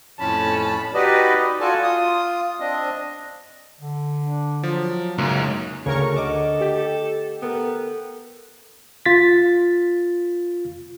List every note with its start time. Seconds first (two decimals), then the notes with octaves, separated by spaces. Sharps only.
0.20 F2 A2 C#4 A5 B5
0.93 D#4 F#4 G4 B4 D5 D#5
1.60 F4 F#4 A4 D5 G#5 A5
1.83 F4 D#6
2.60 C4 D4 D#5
3.81 D3
4.24 D4
4.63 F3 F#3
5.18 C#2 F#2 A#3 C#4 D#4
5.86 D2 C#3 A#4 C#5 C#6
6.16 A4 D#5 F#5 D6
6.61 G4
7.42 B3 A4 A#4 G5
9.06 F4 A6 B6